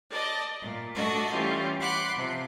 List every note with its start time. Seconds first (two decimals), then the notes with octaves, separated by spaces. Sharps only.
0.10 D5 D#5 A5
0.61 A#2
0.94 A3 D4 F#4 A4 D#5
1.30 E3 G3 C#4 F4
1.80 F#5 B5 C6 D6 F#6
2.15 C3 F3